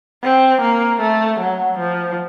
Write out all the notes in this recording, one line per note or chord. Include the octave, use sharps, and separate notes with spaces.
C4
A#3
A3
F#3
F3